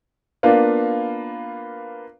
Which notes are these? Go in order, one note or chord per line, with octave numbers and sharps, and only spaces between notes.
A#3 B3 D4 F4